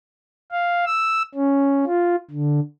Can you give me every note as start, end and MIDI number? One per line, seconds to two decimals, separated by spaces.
0.52 0.85 77
0.86 1.23 88
1.35 1.85 61
1.86 2.16 65
2.31 2.60 50